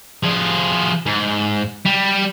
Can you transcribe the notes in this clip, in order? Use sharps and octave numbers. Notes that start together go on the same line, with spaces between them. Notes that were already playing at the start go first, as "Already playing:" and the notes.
F3 G#4
G#2
G3